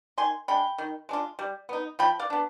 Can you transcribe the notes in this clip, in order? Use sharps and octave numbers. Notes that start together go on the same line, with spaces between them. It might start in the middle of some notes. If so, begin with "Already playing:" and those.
D#3 G#5 C6
G#3 D4 G5 B5
D#3
G#3 D4 F4
G3
B3 D#4
F3 G5 B5
D5 F5
B3 D4